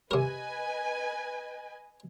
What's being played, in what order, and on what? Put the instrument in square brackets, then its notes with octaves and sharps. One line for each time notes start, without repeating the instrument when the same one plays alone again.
[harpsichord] C3 A#4 [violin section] B4 D#5 G#5